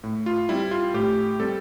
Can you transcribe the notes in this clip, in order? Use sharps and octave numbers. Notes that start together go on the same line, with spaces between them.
A2
F4
G3 C4 E4
F4
A2 G4
G3 C4 A4